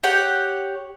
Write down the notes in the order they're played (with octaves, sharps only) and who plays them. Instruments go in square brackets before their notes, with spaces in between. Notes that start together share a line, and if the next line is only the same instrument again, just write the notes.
[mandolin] G4 C#5 F#5